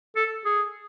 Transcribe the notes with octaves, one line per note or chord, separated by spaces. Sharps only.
A4
G#4